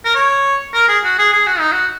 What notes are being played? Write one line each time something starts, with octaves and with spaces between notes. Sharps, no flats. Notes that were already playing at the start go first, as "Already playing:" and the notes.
A#4
C#5
A#4
G#4
F#4
G#4
G#4
F#4
D#4
F#4